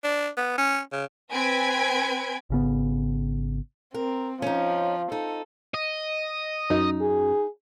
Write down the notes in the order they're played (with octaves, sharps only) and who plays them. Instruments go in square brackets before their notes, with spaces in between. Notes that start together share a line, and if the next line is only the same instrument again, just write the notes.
[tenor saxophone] D4
B3
C#4
C#3
[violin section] C4 B4 G#5 G#6 B6 D7
[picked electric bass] G#1 C#3 B3
[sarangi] C4 [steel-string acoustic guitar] A#4
[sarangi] F3 [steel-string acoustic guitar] C#4 D#4
[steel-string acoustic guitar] D#4 [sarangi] A4
[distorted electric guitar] D#5
[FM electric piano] F#2 [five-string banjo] D#4
[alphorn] G#4